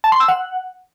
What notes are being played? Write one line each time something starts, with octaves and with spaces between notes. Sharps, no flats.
A5
C6
E6
F#5